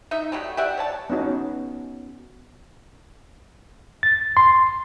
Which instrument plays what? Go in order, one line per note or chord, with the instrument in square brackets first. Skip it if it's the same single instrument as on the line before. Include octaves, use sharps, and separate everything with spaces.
[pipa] D#4 D#5 E5
F#3 G3 A3
G4 D5 E5 F#5
C#5 D5 A5
[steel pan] B3 C#4 D#4 F#4
[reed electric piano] A6
C6